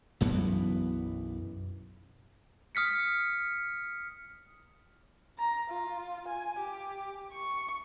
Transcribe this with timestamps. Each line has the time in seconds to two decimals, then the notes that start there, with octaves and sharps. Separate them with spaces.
0.21 B1 F#2 E3 B3
2.75 D#6 F6 B6 C#7
5.38 A#5
5.70 F4
6.28 G#5
6.59 G4
7.33 C#6